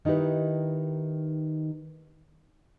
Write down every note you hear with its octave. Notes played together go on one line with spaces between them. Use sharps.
D#3 D#4 E4 G4 B4